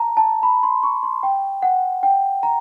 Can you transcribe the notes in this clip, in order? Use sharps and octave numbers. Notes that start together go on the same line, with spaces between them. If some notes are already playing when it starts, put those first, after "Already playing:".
Already playing: A5 A#5
A5
B5
C6
C#6
C6
G5
F#5
G5
A#5